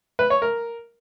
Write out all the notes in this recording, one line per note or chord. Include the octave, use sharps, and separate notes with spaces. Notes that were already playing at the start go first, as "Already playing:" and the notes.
B4
C#5
A#4